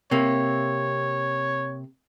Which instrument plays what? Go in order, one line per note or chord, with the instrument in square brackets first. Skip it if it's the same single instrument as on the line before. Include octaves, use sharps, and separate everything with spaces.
[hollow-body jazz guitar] C3 A#3 [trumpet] C#5